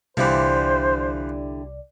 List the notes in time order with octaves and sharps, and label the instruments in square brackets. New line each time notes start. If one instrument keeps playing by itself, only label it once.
[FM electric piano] C2 D5 [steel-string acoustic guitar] D3 E4 G4 [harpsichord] E3 F3 [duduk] C5